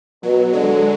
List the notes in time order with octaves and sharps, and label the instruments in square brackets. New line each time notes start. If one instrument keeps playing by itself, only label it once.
[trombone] B2 [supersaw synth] F#3
[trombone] D3 [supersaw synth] G#3